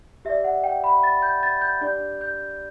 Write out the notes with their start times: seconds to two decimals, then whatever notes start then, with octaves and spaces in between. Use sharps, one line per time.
0.25 G4 D5 E5
0.44 F#5
0.64 G5
0.84 B5
1.03 A6
1.22 G6
1.43 A6
1.61 G6
1.81 D4 G4 D5 G6
2.21 G6